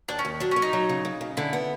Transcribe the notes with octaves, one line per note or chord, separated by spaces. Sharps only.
D#2 D4
C#4
D#2
F#3 D4
C#4
F#3
D#4
F#3
C#3
C#3
C#3
D3 E4
B3